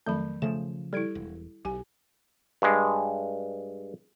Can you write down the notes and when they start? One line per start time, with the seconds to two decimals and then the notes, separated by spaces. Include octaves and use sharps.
0.06 F2 D#3 F#3 A3 B5 G6
0.42 C#3 F3 A3 E7
0.93 G3 E4 A4 G#6 D7
1.15 E1
1.65 B1 G4 G#5
2.62 G2 G#3